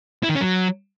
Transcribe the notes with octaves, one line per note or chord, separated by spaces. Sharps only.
E4
D#3
C#4
F#3